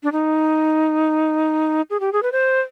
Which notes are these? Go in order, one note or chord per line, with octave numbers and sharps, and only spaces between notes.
D4
D#4
G#4
G4
G#4
B4
C5